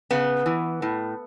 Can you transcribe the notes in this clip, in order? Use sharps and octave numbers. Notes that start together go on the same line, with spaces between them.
C#3 B3
E3
A2